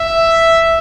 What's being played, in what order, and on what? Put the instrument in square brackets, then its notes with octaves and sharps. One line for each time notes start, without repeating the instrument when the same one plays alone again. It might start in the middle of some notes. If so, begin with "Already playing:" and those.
Already playing: [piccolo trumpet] E5